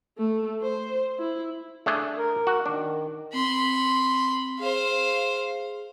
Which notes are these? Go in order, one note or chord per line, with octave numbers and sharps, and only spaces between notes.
A3
C5
E4
A3 D4 G#4
A#4
F#4
D#3 D4
C4 B5 C6
G#4 C5 F5